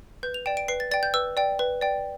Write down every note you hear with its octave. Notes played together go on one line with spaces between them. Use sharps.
B4 G6
F7
D5 G5 E7
D7
B4 C7
A6
D5 G5 A6
G6
B4 E6
D5 G5
B4
D5 G5